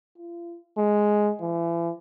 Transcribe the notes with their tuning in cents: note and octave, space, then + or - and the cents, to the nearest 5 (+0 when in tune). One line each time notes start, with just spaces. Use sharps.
F4 -40
G#3 +5
E3 +40